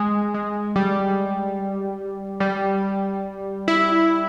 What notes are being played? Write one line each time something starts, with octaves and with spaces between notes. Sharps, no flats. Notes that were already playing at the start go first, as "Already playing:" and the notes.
Already playing: G#3
G#3
G3
G3
E4